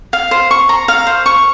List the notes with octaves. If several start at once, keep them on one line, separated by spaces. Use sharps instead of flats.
F5
C5
C#6
A#5
F5
C5
C#6